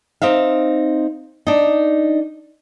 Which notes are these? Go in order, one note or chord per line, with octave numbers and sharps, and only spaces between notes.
C4 D#4 E5 F5
D4 D#4